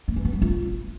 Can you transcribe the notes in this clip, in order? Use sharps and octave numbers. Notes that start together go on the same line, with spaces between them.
A#3
E3
B3
G3
F4